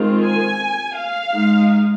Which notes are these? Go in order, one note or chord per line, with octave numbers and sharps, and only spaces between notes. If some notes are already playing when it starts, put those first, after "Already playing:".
Already playing: D#3 G#3 C4 F4
G#5
F5
G#3 D#4